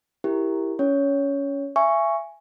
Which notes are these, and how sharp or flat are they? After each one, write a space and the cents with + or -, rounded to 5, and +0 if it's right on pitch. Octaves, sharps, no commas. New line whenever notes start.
E4 +0 G4 +0 A#4 +0
C#4 +15 C#5 +10
E5 +30 G#5 -5 C#6 +0